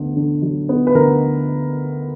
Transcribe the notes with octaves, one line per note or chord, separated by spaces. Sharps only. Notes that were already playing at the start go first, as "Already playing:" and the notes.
Already playing: D2 B3
D3
F#3
B3
B4
D2 A#4